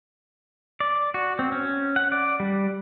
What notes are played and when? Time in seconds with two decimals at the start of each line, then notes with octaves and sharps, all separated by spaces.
0.80 D5
1.14 F#4
1.39 C4
1.52 C#4
1.96 F#5
2.12 D5
2.40 G3